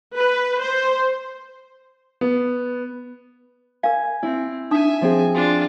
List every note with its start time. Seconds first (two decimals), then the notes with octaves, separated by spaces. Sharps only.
0.17 B4
0.61 C5
2.21 B3
3.83 A#4 F5 G#5
4.23 C4 E4
4.71 D4 D#4 E5 G#5 D#6
5.01 F3 C4 G#4
5.35 D4 F4 F#4